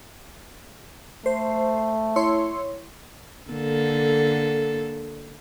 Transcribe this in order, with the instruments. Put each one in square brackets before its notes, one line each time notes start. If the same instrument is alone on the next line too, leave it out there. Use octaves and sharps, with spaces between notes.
[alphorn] A3 [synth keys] C5
[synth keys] E4 C#5 C6
[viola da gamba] D3 A#3 A4